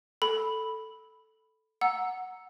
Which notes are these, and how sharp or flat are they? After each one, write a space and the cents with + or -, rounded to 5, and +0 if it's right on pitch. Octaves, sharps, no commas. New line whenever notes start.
A4 +0 B5 +0
F#5 +0 A#5 +0 E6 +0